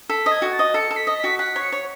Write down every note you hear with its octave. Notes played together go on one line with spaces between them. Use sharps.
A4 B6
D#5
G#6
F#4
A6
D#5
A4 C#7
A4
B6
D#5
B6
F#4
F#5 B6
C#5
C#7
C#5